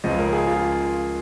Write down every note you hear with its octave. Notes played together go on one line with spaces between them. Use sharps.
C#2 C#3 F3 D#5
A#4
G#4
F4